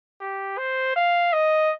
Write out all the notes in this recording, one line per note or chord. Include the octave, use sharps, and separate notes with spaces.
G4
C5
F5
D#5